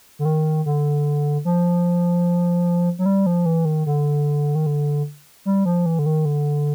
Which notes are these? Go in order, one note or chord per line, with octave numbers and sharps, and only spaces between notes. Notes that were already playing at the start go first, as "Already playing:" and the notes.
D3
D#3
D3
F3
F#3
G3
F3
E3
D#3
D3
D#3
D3
G3
F3
E3
D3
D#3
D3